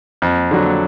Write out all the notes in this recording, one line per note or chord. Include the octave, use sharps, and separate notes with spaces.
F2
D3 F#3